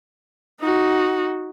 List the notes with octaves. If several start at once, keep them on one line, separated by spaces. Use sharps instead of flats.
D#4 F#4